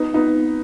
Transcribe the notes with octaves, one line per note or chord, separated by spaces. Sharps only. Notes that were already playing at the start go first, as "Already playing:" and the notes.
Already playing: B3 D#4
B3 D#4